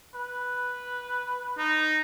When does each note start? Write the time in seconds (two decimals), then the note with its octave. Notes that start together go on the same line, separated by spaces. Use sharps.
0.15 B4
1.58 D#4